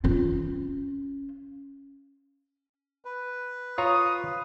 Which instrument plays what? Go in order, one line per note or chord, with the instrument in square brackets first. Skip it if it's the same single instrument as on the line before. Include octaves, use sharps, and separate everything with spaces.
[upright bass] C#4 F4
[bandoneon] B4
[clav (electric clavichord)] F4 C#5 A#5 [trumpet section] D#6